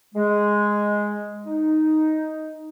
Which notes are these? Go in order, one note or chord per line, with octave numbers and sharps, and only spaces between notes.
G#3
D#4